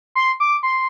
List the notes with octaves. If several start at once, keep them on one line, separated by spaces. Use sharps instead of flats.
C6
D6
C6